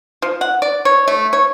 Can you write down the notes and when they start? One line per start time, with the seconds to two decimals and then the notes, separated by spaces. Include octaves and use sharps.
0.22 F3
0.41 F#5
0.62 D5
0.85 C#5
1.08 A3
1.33 C#5